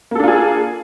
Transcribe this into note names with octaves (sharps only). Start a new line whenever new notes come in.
A#3 D4 F4 G#4 A4